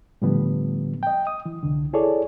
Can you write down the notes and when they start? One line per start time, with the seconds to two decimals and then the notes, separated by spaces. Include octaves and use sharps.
0.22 A2 D3 F3 G3 B3
1.03 D#5 G5
1.27 D#6
1.46 E3
1.63 C2 D3
1.93 E4 G#4 A4 C#5 D5